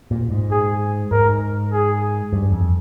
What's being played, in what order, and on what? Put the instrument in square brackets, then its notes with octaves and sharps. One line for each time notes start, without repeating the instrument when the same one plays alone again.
[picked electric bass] A#2
G#2
[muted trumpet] G#4
[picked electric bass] G#2 [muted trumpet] A#4
[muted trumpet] G#4
[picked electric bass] G2
F2